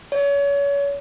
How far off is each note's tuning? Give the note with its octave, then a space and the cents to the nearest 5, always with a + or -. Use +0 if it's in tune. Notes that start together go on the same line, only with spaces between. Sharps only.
C#5 +30